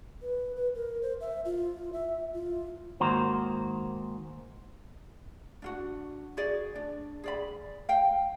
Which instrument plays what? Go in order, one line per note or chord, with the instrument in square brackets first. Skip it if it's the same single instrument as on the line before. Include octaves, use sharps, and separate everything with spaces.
[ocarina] B4
B4
A#4
C5
E5
F4
E5
F4
[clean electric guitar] G#2 D#3 A#3 F#4 C5 A#5
[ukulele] D4 F4 F#4
F#4 G#4 D5 D#5
D4
G#4 D5 B5
F5 G5